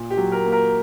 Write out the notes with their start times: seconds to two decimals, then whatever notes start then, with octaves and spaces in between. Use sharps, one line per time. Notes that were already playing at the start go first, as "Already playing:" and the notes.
Already playing: A#2
0.10 G4
0.17 F#3
0.32 A#4
0.45 A#3
0.52 A#4